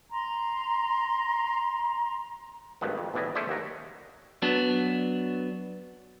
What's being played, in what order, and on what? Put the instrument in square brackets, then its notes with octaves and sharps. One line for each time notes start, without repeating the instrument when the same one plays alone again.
[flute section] A#5 C6
[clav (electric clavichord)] G#1 D2 G2 D#3 B3
F2
B1 E2 A2 D4 E4 D#5
A3 C#4 G#4 C5 D5 E5
D#2 F#4 A#5
[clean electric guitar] F#3 B3 D4